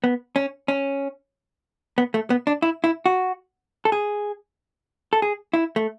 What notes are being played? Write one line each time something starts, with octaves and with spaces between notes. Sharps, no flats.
B3
C#4
C#4
B3
A3
B3
D4
E4
E4
F#4
A4
G#4
A4
G#4
E4
A3